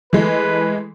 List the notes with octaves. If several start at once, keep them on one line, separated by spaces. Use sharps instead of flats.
E3 G#3 A3 B4